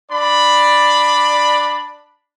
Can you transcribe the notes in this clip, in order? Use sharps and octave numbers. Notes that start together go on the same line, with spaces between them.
D4 D5 B5